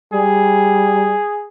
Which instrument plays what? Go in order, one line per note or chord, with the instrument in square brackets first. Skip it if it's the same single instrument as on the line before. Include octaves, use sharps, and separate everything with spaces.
[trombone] G3 [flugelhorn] G#4